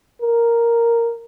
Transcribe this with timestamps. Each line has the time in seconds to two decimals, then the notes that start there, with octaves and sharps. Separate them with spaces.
0.21 A#4